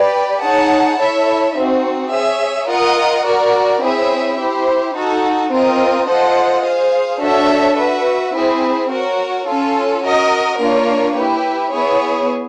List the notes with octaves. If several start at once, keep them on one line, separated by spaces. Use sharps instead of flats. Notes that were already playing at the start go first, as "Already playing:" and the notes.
Already playing: G4 B4 D5
D#4 G#4 C#5 F#5 A5
E4 A4 C#5 E5
C4 D#4 F#4
G#4 C#5 E5
F4 A#4 D#5 F#5
F#4 A#4 D5
C4 E4 G#4 C#5 E5
E4 G4 C5
D#4 F#4 A4
C4 F4 A#4 D#5
F4 A4 C5 D#5 F#5
G#4 C5 F5
D4 F#4 A4 C#5 E5
F#4 B4 E5
C4 E4 G#4
F#4 A#4 C#5
C#4 F4 A4
F#4 A#4 D#5
A#3 D4 F4 A#4 C#5
E4 G4 B4
B3 E4 G#4 C#5